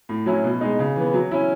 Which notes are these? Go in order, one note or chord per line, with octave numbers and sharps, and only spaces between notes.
A2
F#3 C#4 E4
B2
G#3 D#4
C#3
E3 B3
F#3
C#4 E4